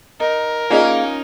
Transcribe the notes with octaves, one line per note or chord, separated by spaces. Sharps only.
D#4 A#4
A#3 C#4 D#4 F4 G#4 D5 D#5